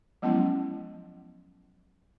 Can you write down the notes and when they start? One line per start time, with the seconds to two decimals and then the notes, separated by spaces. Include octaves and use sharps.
0.22 F3 F#3 G#3 B3 C#4 E4